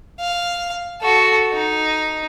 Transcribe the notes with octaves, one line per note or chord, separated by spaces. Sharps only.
F5
F#4 A4
D#4